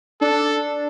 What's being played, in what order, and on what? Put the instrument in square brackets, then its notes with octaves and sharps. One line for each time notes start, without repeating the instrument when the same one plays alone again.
[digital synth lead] D4 [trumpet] A4